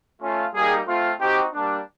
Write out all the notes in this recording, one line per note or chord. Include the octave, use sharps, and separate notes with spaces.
A3 C#4 F4
G3 A#3 D#4 G4 G#4
A3 C4 F4
C4 D#4 F#4 G4
G3 A#3 D4